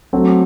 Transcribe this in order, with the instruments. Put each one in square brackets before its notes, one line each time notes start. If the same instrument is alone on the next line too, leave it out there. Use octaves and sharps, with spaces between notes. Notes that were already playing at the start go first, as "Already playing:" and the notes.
[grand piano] F#3 A3 C4 F#4